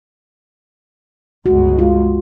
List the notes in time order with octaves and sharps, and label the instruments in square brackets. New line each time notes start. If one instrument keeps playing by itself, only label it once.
[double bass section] G1 C#2 G#3 [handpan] F#4
[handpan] F4